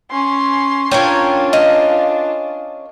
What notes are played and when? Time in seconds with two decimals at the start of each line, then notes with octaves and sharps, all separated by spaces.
0.11 C#4 C6
0.91 C#4 D4 F4 A#4 C#5 G5
1.53 D#5 F5 G#5